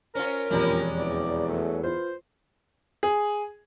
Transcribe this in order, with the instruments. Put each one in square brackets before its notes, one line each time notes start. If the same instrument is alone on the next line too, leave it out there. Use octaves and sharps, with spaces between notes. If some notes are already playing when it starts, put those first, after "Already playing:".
[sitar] C#4 F4 [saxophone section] A#4 [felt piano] C5
[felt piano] E1 F2 A#5 [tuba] A#2 [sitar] G3 G#3 C#4
[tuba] E2 [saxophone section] D5
[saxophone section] G2 F#3 A3
[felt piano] F4 B4 [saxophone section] C5
[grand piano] G#4